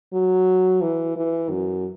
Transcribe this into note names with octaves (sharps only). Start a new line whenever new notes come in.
F#3
E3
E3
F#2